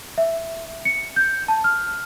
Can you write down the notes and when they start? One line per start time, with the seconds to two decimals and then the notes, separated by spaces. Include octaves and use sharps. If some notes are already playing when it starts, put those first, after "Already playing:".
0.18 E5
0.85 C#7
1.16 G6
1.48 A5
1.64 F6